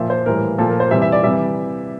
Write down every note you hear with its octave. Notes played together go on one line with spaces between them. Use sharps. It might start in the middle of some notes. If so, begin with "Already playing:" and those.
Already playing: A#2 F3 E5
C5
A2 E3 G3 A#4
A#2 F3 A4
A#4
C5
C3 E3 G3 E5
E5
D5
C3 E3 G3 E5